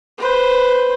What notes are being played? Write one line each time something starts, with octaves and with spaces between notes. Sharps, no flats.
B4 C5